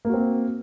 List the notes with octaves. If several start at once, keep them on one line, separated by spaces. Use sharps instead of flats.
A#3 C4 F#4